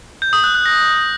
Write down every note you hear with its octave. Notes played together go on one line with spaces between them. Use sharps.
G6
D#6
F#6
F#6
A#6